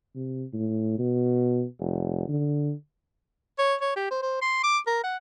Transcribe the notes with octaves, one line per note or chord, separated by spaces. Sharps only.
C3
A2
B2
F1
D3
C#5
C#5
G4
C5
C5
C6
D6
A#4
F#5